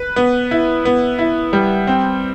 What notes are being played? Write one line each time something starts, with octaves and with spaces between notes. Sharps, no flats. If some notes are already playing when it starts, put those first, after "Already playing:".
Already playing: B4
B3
E4
B3
E4
G3
C4